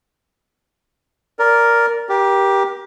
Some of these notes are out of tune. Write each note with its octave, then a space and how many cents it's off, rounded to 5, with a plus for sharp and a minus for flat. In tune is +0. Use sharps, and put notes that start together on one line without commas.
A#4 +0 D5 -15
G4 +0 A#4 +30